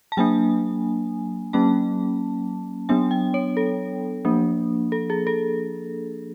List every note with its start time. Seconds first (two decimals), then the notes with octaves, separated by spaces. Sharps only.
0.12 A5
0.17 F#3 A#3 D4 G#5
1.53 F#3 A#3 C#4 A5
2.89 F#3 B3 D4 G#5
3.11 G5
3.34 C#5
3.57 A4
4.25 F3 A#3 D4
4.92 A4
5.10 G#4
5.27 A4